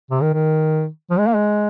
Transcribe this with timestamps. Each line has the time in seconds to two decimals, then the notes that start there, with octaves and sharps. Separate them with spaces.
0.11 C3
0.22 D#3
0.33 D#3
1.10 F3
1.19 G#3
1.27 A#3
1.36 G#3